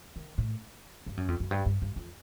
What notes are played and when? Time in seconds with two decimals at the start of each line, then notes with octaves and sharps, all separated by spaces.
0.16 D#3
0.38 A2
1.06 G2
1.17 F#2
1.28 F2
1.40 F#2
1.51 G2
1.66 G2
1.82 G2
1.96 F2